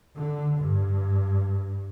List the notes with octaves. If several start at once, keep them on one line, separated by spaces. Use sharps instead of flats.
D3
G2